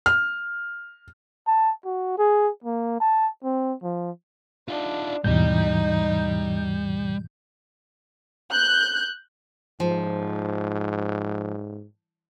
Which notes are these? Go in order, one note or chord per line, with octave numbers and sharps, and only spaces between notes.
F6
A5
F#4
G#4
A#3
A5
C4
F3
D4 D#4 F4
D#2 G#2 B2 E3 G3 D#4 G6
F#6 G6
G#2 F3